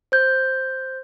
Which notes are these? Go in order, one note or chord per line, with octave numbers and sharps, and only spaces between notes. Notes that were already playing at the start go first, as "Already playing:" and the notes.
C5 G6